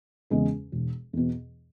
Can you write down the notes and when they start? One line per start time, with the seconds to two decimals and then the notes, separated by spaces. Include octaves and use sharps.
0.30 E2 C#3 G#3 B3
0.72 E1
1.13 E2 B2